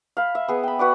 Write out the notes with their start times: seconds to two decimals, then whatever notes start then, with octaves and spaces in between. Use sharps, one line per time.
0.17 F5 B5
0.35 E5
0.48 B3 G#4 B4
0.63 G5 B5
0.79 F#4 B4 D5